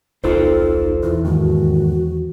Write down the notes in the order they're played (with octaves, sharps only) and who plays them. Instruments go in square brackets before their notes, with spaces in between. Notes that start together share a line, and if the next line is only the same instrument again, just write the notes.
[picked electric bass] D#1 B1 [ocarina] D#4 [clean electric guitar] F4 A4 C5
[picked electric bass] E2 [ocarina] E4
[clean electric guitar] D#2 G#2 [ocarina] F#4